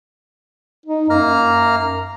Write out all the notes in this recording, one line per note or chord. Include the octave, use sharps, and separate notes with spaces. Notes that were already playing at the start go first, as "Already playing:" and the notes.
D#4
F#2 A#3 A#5 F6